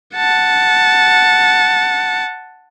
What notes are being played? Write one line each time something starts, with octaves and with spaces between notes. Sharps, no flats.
F#5 A5